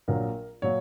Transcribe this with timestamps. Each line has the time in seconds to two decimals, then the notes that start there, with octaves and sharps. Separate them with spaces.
0.08 A#1 A#2 F#3 A#4
0.62 A#2 F#3 C#5